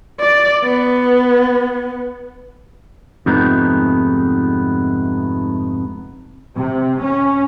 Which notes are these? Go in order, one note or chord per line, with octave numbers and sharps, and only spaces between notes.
D5
B3
F2 G#2 C3 A3 B3 D#4
C3
C#4